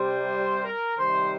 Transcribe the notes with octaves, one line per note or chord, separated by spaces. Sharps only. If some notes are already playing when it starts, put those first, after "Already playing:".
Already playing: C3 G3 C5
A#4
C3 D#3 G3 C5